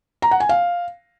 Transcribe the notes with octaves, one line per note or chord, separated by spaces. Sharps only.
A#5
F#5
G#5
F5